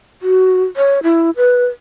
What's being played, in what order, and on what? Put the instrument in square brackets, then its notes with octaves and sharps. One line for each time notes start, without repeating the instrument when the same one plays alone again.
[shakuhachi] F#4
C#5
E4
B4